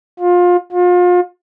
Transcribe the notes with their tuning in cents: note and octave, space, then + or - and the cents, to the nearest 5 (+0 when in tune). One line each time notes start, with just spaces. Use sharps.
F4 +25
F4 +35